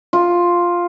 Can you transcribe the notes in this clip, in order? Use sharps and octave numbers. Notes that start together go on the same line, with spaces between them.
F4